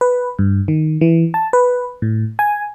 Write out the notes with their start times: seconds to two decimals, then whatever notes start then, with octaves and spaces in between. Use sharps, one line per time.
0.01 B4
0.39 G2
0.68 D#3
1.01 E3
1.34 A5
1.53 B4
2.02 A2
2.39 G#5